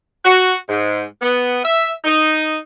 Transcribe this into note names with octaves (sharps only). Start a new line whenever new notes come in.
F#4
G#2
B3
E5
D#4